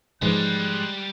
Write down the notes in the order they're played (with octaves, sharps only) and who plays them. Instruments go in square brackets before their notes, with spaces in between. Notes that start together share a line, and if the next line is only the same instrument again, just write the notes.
[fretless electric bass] G#2 E3 F3 [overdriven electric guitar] G3 [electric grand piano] G#3 [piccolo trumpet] F#6